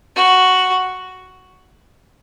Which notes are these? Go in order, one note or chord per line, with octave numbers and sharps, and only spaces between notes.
F#4